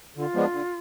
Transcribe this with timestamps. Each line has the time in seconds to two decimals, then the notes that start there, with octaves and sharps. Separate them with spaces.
0.16 D3 F4
0.34 F3 G#3 B3 D4
0.52 D3